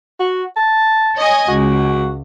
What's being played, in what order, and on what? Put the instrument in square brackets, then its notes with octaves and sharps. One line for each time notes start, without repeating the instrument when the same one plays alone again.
[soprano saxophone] F#4
A5
[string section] C#5 D#5 G#5
[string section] C#2 [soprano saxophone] F#4